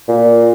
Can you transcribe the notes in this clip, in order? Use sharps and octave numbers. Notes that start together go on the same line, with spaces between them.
A#2